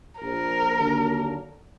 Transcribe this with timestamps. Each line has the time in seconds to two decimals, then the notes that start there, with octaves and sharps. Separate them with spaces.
0.20 A#1 A#2 F3 A#4
0.77 D#2 D3 F#3 A#3 D4